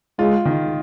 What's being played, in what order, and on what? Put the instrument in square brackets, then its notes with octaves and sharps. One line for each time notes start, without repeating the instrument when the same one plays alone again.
[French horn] G#3 [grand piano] F4
[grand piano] D#3